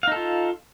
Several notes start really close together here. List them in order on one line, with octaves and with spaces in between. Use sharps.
F5 D#4 A4 F4